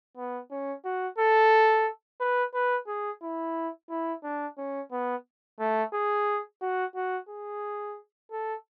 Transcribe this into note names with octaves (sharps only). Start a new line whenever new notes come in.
B3
C#4
F#4
A4
B4
B4
G#4
E4
E4
D4
C#4
B3
A3
G#4
F#4
F#4
G#4
A4